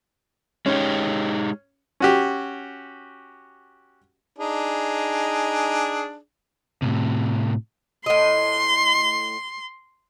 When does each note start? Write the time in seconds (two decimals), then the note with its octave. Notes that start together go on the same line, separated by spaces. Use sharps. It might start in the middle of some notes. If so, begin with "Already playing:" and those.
0.66 G#3 C#4 D#4 G4
2.00 C#4 F#4 G4
4.38 D4 D#4 G#4
6.82 A2 C3
8.06 A2 D#5 C6